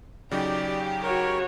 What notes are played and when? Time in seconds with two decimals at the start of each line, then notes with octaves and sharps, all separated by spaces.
0.31 C#3 F#3 D#4 G4 D5
1.03 F#4 A#4 C#5